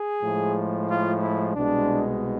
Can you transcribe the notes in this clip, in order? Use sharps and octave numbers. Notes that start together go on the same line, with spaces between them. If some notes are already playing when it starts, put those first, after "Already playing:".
Already playing: G#4
A2 F3 G#3
F4
E4
C2 B2 G#3 D4